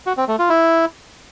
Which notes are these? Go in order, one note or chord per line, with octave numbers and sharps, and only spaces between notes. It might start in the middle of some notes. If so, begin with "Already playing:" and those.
F#4
C4
A3
F4
E4